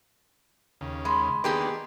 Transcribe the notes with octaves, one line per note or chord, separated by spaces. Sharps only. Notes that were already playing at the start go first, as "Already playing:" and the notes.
D#2 C#3
G#3 B5 C6
D#3 A#3 B3 D4 G4 G#4